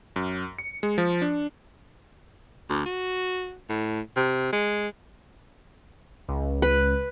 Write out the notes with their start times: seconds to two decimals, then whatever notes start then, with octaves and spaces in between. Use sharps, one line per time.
0.16 F#2
0.59 C#7
0.83 G#3
0.98 F3
1.22 D4
2.69 D2
2.86 F#4
3.69 A2
4.16 C3
4.53 G#3
6.28 C#2
6.62 B4